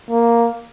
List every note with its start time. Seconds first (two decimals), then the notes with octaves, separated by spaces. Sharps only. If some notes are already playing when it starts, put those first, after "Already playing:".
0.10 A#3